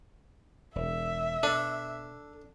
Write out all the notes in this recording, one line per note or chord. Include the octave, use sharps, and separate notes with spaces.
E1 E5
B2 D4 A4